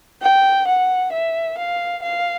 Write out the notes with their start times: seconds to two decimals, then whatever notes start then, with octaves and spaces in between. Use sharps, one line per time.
0.22 G5
0.67 F#5
1.12 E5
1.58 F5
2.03 F5